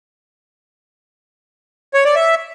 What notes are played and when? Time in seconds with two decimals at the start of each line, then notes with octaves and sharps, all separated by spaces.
1.94 C#5
2.05 D5
2.15 E5